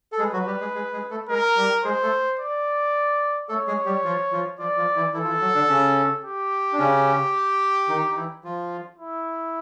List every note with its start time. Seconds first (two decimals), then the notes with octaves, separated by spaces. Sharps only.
0.12 A4
0.19 G#3 G#4 B4
0.33 F#3 F#4
0.46 G3 G4
0.60 G#3 G#4
0.74 G#3 G#4
0.93 G#3 G#4
1.11 A3 A4
1.29 G#3 G#4 A#4
1.56 G3 G4
1.84 G#3 G#4 C5
2.02 A3 A4
2.39 D5
3.49 A3 A4 C#5
3.67 G#3 G#4
3.85 G3 G4
4.04 F3 F4
4.31 F3 F4
4.59 F3 F4 D5
4.77 F3 F4
4.96 E3 E4
5.14 E3 E4 A4
5.23 F4
5.28 E3 E4
5.41 F#3 F#4
5.55 D3 D4
5.69 C#3 C#4
6.25 G4
6.73 D4
6.79 C#3 C#4
7.88 D#3 D#4
8.11 D#4
8.16 E3 E4
8.44 F3 F4
8.98 E4